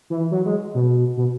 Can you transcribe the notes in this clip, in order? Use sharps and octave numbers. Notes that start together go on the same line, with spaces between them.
E3
F#3
G#3
B2
B2